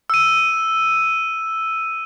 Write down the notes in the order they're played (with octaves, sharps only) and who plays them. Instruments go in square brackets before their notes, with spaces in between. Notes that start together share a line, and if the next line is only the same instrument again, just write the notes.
[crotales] E6 D#7